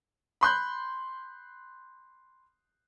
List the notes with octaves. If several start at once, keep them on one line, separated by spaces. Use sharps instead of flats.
B5 C6 F#6 G6